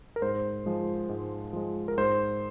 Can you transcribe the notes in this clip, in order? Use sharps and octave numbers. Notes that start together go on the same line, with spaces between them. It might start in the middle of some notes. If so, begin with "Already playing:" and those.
A#4
G#2 C5
F3 G#3
G#2
F3 G#3
A#4
G#2 C5